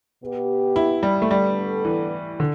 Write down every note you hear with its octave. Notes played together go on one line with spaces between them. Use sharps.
B2 B3 G4
E4
G3
A3
D3 G3 B3 D4 A4
E3
D3